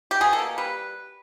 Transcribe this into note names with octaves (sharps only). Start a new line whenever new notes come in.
G4
B2 G#4
A4
A#3
G3 B4